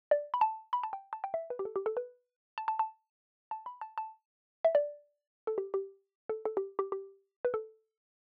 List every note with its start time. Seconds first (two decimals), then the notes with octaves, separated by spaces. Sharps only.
0.11 D5
0.34 B5
0.41 A5
0.73 B5
0.84 A5
0.93 G5
1.13 A5
1.24 G5
1.34 E5
1.50 B4
1.59 G4
1.65 A4
1.76 G4
1.86 A4
1.97 B4
2.58 A5
2.68 A5
2.79 A5
3.51 A5
3.66 B5
3.81 A5
3.98 A5
4.65 E5
4.75 D5
5.47 A4
5.58 G4
5.74 G4
6.29 A4
6.45 A4
6.57 G4
6.79 G4
6.92 G4
7.45 B4
7.54 A4